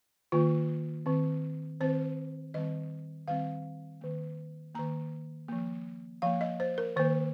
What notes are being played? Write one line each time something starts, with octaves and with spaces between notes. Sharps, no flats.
D#3 A#3 F4
D#3 C4
D#3 C4 C5
D#3 G3 C4 D#5
D#3 G3 C4 F5
D#3 A#3
D#3 A#3 A#5
F3 A#3
F3 A#3 F5
D#5
C5
A#4
D#3 A#3 C5